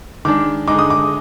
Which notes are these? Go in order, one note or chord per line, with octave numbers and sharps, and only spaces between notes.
D#3 G#3 D4 D6
D3 G#3 D#4 D6
D#6
D6